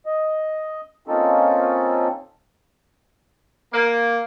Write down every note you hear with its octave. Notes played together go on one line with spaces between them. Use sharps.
D#5
A#3 C4 C#4 D#4 F4 A4
A#3